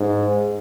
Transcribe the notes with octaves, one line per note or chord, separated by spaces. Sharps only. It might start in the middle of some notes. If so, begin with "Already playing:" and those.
Already playing: G#2